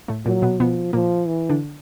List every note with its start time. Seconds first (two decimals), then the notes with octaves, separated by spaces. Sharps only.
0.08 A2 A3
0.26 A#2 F#3 A#3
0.42 B2 B3
0.59 B2 F3 B3
0.93 A#2 F3 A#3
1.27 E3
1.49 D3 D4